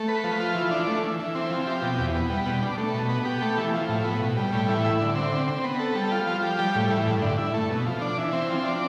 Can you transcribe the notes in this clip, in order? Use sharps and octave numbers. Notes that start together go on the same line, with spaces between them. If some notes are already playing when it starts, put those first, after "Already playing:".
Already playing: A3
B4
F3
F4
E3
D4
A3
E3
E3
C4
F3
G4
B2
E2
B3
G3
B2
D4
A3
B2
B3
G4
A3
E3
F3
A2
B3
B2
G3
A2
E3
E4
D3
C4
D3
C4
B3
A4
G3
F4
F3
G4
G3
A2
E3
G2
D3
E4
A3
B2
F3
D4
E3
C4
F3
D4